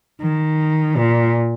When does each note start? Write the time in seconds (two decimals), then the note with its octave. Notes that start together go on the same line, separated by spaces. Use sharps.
0.21 D#3
0.97 A#2